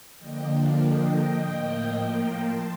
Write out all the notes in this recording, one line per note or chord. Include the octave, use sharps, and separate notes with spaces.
D3 F3 A#3 D4 D#5 G5
D5 F5
D#5 G5
D#5 G5
A2 F3 A#3
G5 A#5
A5 C6